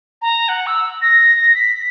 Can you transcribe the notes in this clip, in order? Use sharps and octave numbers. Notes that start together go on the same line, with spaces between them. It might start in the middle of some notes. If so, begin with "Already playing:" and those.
A#5
F#5
E6
A#6
B6